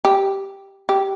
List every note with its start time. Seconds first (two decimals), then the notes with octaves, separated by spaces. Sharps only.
0.05 G4
0.89 G4